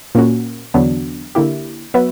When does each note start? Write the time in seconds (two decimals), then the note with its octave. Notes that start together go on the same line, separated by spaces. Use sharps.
0.15 A#2 A#3 C#4 F#4
0.74 E2 D3 F#3 B3 D4
1.35 D3 A#3 E4 G4
1.94 F#3 B3 F#4 B4 E5